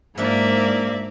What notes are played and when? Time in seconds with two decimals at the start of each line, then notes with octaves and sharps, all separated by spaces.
0.18 G#2 F3 A#3 D4 D5 E5